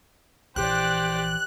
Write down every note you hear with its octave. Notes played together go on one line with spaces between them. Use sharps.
A#1 E3 G4 C5 D5 F#6